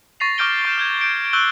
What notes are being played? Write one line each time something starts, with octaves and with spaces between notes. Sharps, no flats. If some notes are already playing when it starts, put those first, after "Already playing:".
C#6 A6 A#6 C7 F7
C#6 D6 F6 G6 D7 G7
C#6 G6 E7
F6 G6 G#6
G6 D7
C#6 E6 F#6 G6 G7